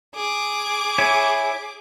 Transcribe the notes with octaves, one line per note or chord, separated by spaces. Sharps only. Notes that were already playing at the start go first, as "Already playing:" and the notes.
G#4 D6
E4 C#5 G#5